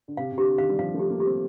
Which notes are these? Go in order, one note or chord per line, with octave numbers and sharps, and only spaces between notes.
D3
C3 F5
C3
D3 G4
D#3 F5
G3
F3 F5
A3
G4
A#3
G4
C4